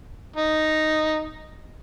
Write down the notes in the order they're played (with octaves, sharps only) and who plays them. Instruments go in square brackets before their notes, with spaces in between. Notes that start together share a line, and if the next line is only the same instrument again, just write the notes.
[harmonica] D#4